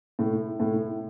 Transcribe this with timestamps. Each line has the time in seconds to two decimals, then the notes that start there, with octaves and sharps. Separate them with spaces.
0.19 A2
0.60 A2